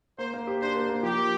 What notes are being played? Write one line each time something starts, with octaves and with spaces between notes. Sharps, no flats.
A#3 C5
A#3
G4
D4 C5
A#3
A#3
F3 G4
A#4